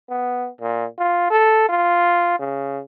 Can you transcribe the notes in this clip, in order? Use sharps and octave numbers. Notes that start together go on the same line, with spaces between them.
B3
A#2
F4
A4
F4
C#3